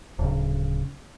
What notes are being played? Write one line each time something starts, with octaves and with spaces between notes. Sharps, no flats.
D1 C#3